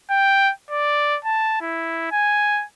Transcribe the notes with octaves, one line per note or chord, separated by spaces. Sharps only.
G5
D5
A5
E4
G#5